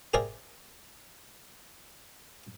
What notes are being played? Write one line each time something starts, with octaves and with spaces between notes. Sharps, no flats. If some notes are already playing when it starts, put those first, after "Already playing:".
G4 G#4 A#4 C5 D5 E5